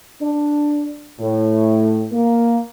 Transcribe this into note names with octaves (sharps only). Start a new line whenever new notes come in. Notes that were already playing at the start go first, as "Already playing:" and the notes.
D4
A2
A#3